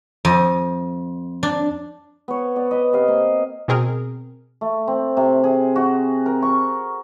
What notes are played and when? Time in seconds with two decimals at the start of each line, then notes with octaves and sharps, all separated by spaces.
0.25 F2 D#5
1.43 D4
2.28 B3 C#5
2.56 B3 D5
2.71 B4 D#5
2.93 C3 D#5 F5
3.08 A#3
3.68 B2 C4 G#4 A#4
4.61 A3
4.88 C4
5.17 C3
5.44 G#4
5.76 F#4
6.26 A#4
6.43 C#6